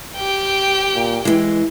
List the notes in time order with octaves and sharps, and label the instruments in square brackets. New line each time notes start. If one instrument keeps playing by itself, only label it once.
[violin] G4 G5
[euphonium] A#2
[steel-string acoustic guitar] E3 G#3 [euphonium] E4